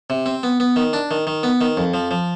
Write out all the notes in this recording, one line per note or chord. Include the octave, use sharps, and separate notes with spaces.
C3
C4
B3
B3
D#3
D4
D#3
D#3
B3
D#3
F2
F3
F3